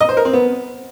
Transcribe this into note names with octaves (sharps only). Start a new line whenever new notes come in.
D#5
C5
A#4
C4
B3